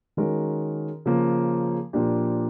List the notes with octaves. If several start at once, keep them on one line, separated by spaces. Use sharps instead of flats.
D#3 G#3 C#4 F#4 A#4
C#3 F3 A#3
A#2 F3 A#3 D4 G4